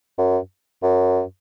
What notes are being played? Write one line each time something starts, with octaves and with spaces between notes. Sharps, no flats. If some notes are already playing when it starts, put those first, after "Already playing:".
F#2
F#2